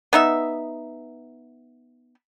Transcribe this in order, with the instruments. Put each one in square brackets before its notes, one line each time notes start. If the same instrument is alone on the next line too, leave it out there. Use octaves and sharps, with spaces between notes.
[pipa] B3 D#4 E5